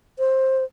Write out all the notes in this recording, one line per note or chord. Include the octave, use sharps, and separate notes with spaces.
C5